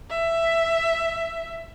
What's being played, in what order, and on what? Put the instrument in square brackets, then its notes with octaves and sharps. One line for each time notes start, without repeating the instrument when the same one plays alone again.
[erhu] E5